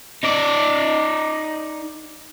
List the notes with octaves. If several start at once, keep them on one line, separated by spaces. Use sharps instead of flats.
D#4 D5